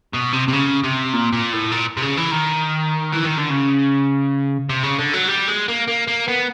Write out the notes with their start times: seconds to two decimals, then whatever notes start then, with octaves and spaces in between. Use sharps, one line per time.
0.14 B2
0.33 C3
0.48 C3
0.53 C#3
0.83 C3
1.13 A#2
1.32 A#2
1.53 A2
1.71 A#2
1.97 C3
2.02 C#3
2.17 E3
2.31 D#3
3.13 E3
3.25 D#3
3.38 D3
3.50 C#3
4.70 C3
4.83 C#3
4.99 D3
5.13 F#3
5.28 G3
5.48 G#3
5.68 A#3
5.88 A#3
6.08 A#3
6.28 B3